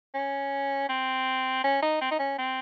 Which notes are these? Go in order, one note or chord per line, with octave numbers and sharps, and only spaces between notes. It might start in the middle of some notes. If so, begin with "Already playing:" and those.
C#4
C4
C#4
D#4
C4
D#4
C#4
C4